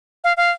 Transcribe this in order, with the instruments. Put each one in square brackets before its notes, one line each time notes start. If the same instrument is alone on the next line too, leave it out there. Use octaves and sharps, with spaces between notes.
[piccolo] F5
F5